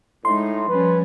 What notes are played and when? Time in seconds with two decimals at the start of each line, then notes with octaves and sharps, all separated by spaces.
0.25 A2 G#3 D#4 C6
0.69 F3 G3 C#4 B4